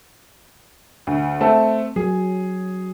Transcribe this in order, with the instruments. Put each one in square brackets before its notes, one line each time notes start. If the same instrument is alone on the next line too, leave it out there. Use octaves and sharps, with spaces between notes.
[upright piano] D2
A3 C4 A4
[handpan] F#3 [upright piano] G#4